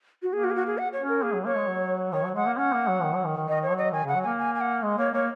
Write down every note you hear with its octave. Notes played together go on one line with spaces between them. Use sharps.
F#4
A#3 G#4
F#4
G#4
F#4
G#4
F#5
C#5
C#4
A#4
A#3 G#4
F#3
A#3 C#5
G#3
F#3
D#3 C#5
F#3
G#3 F#5
A#3
C#4 F#5
A#3
F#3
D#3
F#3
D#3
D#3
D#3 D#5
C#5
F#3
D#5
D#3 G#5
C#3 F#5
F#3
A#3 G#5
G#5
G#5
F#5
G#3
A#3 C#5
A#3 C#5